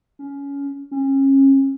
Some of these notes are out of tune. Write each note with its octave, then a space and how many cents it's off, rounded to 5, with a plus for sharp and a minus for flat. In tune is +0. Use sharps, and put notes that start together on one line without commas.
C#4 +20
C#4 -30